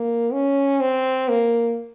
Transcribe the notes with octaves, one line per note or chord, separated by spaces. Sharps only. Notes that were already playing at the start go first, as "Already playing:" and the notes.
Already playing: A#3
C#4
C4
A#3